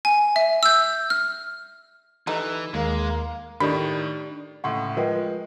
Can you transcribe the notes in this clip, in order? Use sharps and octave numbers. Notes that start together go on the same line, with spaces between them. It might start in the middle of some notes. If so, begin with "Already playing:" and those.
G#5
E5
E6 G6
F6
E3 G3 A3 D#4
D#2 G#3 A#3
A2 D#3 D4 G4 D5 B5
C#2 A2 C#3 F#5 C6 C#6
F3 G#3 A#4 B4 G5